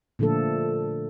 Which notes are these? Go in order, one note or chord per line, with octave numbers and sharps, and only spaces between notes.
A#2 D3 F3 A3 A4